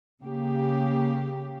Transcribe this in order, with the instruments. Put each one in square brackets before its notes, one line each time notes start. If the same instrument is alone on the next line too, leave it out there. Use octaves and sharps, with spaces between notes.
[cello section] C#3 A#3 G4